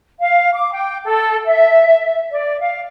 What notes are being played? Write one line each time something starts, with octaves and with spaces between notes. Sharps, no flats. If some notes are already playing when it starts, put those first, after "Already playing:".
F5
D6
G5
A4
E5
D5
F5